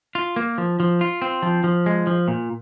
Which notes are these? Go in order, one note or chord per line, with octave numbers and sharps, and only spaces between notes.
F4
A#3
F3
F3
F4
C4
F3
F3
G#3
F3
A#2